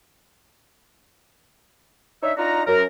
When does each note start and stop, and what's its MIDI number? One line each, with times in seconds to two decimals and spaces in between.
2.23 2.33 62
2.23 2.33 63
2.23 2.33 73
2.23 2.33 76
2.37 2.62 62
2.37 2.62 63
2.37 2.62 65
2.37 2.62 66
2.37 2.62 82
2.67 2.85 42
2.67 2.85 70